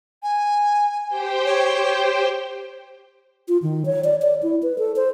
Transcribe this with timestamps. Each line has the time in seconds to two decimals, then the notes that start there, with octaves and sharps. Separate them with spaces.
0.23 G#5
1.09 G4 C5 G5
1.45 C#5
3.48 F4
3.62 D#3
3.86 C#5
4.04 D5
4.22 D5
4.43 E4
4.63 B4
4.78 A4
4.96 C5